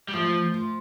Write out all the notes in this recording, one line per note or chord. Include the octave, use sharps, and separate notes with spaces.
G3
F3 A3
F3